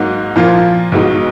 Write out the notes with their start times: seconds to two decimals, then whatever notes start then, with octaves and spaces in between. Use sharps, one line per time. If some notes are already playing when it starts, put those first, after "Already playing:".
Already playing: G#2 F#3 A#3 D#4 F#4
0.36 A#2 F3 A#3 F4
0.92 B1 B2 G#3 D#4